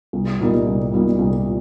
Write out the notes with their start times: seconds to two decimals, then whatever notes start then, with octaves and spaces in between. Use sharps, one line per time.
0.13 C2
0.40 A#2 G3 A#3 D#4
0.67 C2
0.92 A#2 G3 A#3 D#4
1.19 C2
1.45 A#2